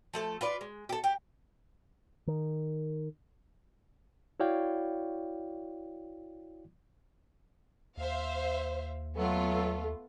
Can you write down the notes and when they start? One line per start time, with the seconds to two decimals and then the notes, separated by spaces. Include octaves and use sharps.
0.14 F3 A3 A4
0.41 F4 B4 D5
0.61 G#3
0.89 G4 A4
1.04 G4
2.27 D#3
4.40 E4 F#4 C#5 D5 F5 G5
7.97 D#2 C5 E5 F5
9.17 F#3 A3 B3 F4 A4